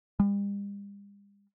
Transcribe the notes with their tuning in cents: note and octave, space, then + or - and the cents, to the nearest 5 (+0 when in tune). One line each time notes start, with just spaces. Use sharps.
G3 +45